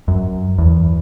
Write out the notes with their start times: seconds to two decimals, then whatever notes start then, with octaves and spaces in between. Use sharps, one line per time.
0.08 F#2
0.58 E2